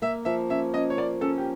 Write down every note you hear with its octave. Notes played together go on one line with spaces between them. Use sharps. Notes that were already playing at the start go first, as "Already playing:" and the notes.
A#3 E5
F3 E5
C#4 E5
C#4 D#5
C#5
A#3 D5
C#4 A4
G4